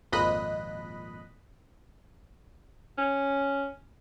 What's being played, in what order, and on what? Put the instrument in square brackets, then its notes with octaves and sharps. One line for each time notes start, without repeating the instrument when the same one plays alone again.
[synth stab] G#1 F2 A#2 D#5 B5 F#6
[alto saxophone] C#4